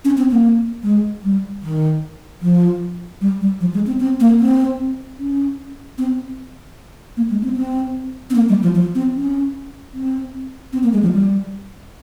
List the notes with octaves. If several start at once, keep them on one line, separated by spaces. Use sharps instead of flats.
C#4
C4
A#3
G#3
G3
D#3
F3
G3
G3
F3
G#3
C4
C4
A#3
C4
C#4
C4
A#3
G#3
C4
C4
C4
A#3
G3
F3
F3
C4
C#4
C4
C4
A#3
G#3
F3
G3